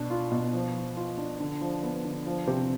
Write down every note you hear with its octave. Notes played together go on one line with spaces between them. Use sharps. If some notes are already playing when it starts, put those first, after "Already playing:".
Already playing: B2 D4
F4
B2
F3
F3
F4
D4
D3
F3
B3
D3
F3
C3